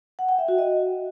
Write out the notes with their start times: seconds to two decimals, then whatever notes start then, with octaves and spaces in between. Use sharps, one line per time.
0.19 F#5
0.29 G5
0.39 E5
0.48 F#4
0.58 D#5